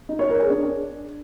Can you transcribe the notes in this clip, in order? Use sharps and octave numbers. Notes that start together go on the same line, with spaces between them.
D#4
C#5
A#4
G#4
D4